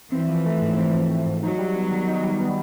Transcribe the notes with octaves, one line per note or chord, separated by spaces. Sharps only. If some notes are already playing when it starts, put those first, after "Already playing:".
E3 C4
F3
A3
G#2
C4
F3
A3
G#2
F#3 D#4
G3
B3
D#3
D#4
G3
B3